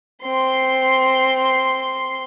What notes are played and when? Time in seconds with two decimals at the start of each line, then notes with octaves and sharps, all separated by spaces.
0.25 C4 C6